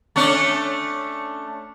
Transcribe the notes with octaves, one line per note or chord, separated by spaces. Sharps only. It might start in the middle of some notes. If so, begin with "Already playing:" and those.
A3 C#4 D4